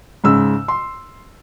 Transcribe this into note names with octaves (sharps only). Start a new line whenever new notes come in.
G#2 C#3 E6
C6